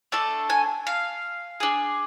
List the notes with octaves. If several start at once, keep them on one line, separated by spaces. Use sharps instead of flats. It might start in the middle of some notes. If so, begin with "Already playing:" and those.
A3 D4 A4
G#5
F5
D4 G#4